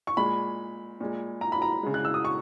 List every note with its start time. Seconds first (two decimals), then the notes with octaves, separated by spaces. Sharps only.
0.07 C#6
0.17 A#2 G#3 B5
1.01 A#2 G#3
1.41 A#5
1.52 B5
1.62 A#5
1.83 C#3 G#3
1.94 F#6
2.05 E6
2.14 D#6
2.25 C#6